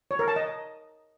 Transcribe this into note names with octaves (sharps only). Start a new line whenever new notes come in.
C#5
A#4
A5
D#5